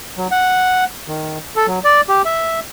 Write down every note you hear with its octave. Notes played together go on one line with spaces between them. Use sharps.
F#3
F#5
D#3
A4
F#3
D5
G4
E5